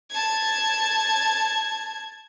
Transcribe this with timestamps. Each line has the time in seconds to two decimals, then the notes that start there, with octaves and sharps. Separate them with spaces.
0.11 A5 G#6